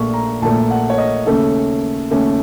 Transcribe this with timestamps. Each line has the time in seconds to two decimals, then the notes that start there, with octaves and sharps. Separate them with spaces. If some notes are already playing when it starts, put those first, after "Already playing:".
Already playing: A#1 A#2 A3 C#6
0.14 A#5
0.42 A#1 A#2 A3 A5
0.70 F#5
0.90 C#5
0.98 D#5
1.26 D#2 C#3 A3 C#4 A4
2.11 D#2 C#3 A3 C#4